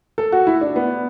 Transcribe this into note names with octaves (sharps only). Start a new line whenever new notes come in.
A4
F#4
E4
D4
B3